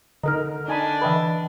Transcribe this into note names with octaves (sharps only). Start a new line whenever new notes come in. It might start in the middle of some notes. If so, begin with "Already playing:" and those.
D3 D#4 A#4 D#5 A#5 F6
D4 D#4 G#5 B5
E3 B4 D#5 E5 G5 B5